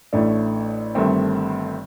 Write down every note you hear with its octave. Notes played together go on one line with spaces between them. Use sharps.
A1 A2 A3 D4
G1 G2 D#3 A3 C4